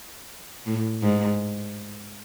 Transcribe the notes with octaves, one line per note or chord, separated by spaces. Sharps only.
A2
G#2